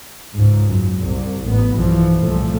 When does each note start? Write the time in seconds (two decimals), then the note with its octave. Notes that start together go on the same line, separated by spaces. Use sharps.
0.35 C#2 G#2
0.68 F#1 F#2
1.01 C2
1.46 A1 B3
1.74 B1 G2 E3 F3
2.19 C2 A#2 F3 A3